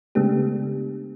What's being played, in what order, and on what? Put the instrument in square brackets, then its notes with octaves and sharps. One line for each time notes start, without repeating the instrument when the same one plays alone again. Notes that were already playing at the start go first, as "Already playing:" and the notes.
[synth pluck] C#3 G#3 A3 B3 D4 G4